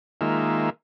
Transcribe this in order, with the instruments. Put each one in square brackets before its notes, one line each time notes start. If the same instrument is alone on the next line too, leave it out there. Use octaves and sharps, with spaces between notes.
[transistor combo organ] D#3 G#3 A#3 F4 E5